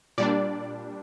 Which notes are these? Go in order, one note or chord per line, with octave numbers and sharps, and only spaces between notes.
A#2 G3 D4 D5